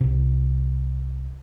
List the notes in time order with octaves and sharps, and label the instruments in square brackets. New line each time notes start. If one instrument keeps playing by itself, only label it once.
[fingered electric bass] C2 C3